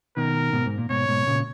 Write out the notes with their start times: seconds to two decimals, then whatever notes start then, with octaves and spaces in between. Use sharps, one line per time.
0.17 B2 D#3 A#4
0.53 G#2 B2
0.66 G#2
0.78 A#2
0.90 G#2 B2 C#5
1.08 G#2 B2
1.26 A#2 C#3